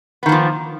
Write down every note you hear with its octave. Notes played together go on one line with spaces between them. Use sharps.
D#3 F3 A#3 B3